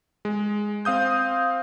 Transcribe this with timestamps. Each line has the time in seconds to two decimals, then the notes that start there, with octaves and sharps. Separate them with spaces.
0.25 G#3
0.85 C4 F5 D#6 G6